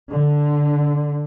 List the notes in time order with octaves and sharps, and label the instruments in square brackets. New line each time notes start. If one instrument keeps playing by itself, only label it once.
[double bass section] D3